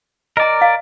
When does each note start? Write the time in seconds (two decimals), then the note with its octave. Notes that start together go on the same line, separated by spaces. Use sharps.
0.37 A#4 D5 D#5 A#5
0.61 F5